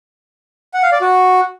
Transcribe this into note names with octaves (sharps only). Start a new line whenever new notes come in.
F#5
F5
D5
F#4